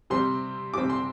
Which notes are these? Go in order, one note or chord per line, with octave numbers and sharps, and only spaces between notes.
C3 G3 C4 C6
C3 G3 C4 D6
C6